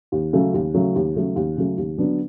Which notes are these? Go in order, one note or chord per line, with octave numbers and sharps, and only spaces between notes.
D#2
C#3 F#3 A3
D#2
C#3 F#3 A3
D#2
C#3 F#3 A3
D#2
C#3 F#3 A3
D#2
D3 F#3 B3 D4